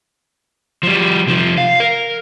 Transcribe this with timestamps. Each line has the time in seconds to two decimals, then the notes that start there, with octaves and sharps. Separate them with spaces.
0.83 F3 G3
1.27 C3 F3
1.58 F5
1.80 A#4